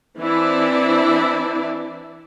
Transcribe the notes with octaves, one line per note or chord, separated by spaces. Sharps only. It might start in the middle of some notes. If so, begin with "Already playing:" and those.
E3 C4 D4 E4 D5